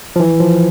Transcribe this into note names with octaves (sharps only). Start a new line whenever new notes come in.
F3
E3
F3